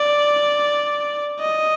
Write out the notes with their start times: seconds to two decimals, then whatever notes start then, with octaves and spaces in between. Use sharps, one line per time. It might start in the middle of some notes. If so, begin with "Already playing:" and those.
Already playing: D5
1.40 D#5